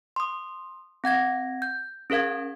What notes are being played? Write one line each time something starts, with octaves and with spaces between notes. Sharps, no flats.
C6 D#6
C4 F#5 G#6 A#6
G6
C#4 G#4 A#4 F5 G#6